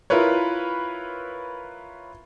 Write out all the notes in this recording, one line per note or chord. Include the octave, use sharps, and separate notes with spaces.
E4 F4 A#4 B4 C#5